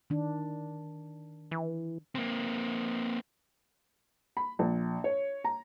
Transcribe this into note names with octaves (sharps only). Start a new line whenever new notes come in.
D#3 D4
E3
A#3 C4
B5
A#1
C#5
A#5